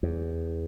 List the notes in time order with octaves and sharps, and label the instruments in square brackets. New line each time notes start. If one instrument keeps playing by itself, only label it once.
[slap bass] E2